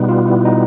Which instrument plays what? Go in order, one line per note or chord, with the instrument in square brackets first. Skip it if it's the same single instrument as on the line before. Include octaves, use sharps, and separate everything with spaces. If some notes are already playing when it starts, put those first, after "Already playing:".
Already playing: [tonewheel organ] B2 G3 B3 [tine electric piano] D#4
[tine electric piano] F4
E4
D#4